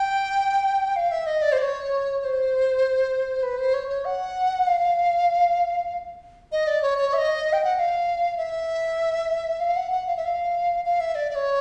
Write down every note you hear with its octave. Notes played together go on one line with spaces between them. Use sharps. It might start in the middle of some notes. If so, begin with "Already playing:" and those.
Already playing: G5
F5
E5
D#5
D5
C5
D5
C#5
C#5
C5
B4
C5
C#5
C#5
F#5
F5
D#5
D5
C#5
C#5
E5
D#5
G5
F#5
F#5
F5
E5
F5
F#5
F#5
F5
E5
F5
F5
E5
D5
D5
C#5